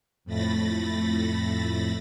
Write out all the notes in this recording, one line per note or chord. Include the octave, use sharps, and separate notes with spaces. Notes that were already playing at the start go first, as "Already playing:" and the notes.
F2 A2 A3 B5 A6 A#6